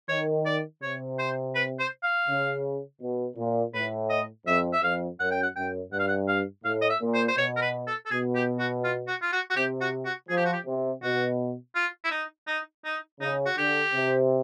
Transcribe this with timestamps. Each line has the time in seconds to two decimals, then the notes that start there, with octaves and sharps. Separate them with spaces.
0.09 D#3 C#5
0.45 D5
0.82 C3 C#5
1.19 C5
1.55 B4
1.79 C5
2.03 F5
2.28 C#3
3.01 B2
3.37 A#2
3.74 A2 B4
4.10 D#5
4.46 F2 E5
4.73 E5
4.82 F2 F5
5.19 F#2 F#5
5.31 G5
5.43 F#5
5.56 F#2 G5
5.92 G2 F#5
5.99 F5
6.08 F#5
6.28 F5
6.64 A2 F5
6.81 D#5
6.90 E5
7.01 A#2
7.14 C5
7.28 C5
7.37 B2 C#5
7.56 A#4
7.62 B4
7.87 A4
8.06 A4
8.11 B2 G#4
8.35 G4
8.59 F#4
8.84 F4
9.07 F#4
9.22 F4
9.32 F#4
9.50 F#4
9.56 C3 G4
9.81 F#4
10.05 F#4
10.29 F3 G#4
10.37 G4
10.45 F#4
10.53 G4
10.66 C3
11.03 B2 F#4
11.75 F4
12.04 E4
12.11 D#4
12.47 D#4
12.85 D#4
13.20 C#3 D#4
13.46 F#4
13.57 D3 G4
13.93 C3